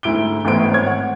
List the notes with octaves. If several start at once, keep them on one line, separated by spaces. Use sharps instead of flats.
D2 G#2 E4 D7 G7
A1 A2 B3 C5 D7
G#1 C#5 G#6
F#5